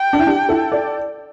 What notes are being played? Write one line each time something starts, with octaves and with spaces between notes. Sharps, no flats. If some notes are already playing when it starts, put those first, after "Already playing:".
Already playing: G5
D4
E4
D4 G4
E4 A4
A4 D5